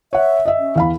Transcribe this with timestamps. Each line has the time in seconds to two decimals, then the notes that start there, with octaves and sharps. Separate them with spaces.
0.13 C#5 E5 F#5
0.45 D#5 E5
0.59 C#4
0.76 E2 F5 B5